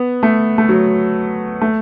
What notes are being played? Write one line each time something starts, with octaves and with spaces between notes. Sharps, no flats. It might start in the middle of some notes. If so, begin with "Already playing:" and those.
Already playing: B3
A3
A3
F#3
A3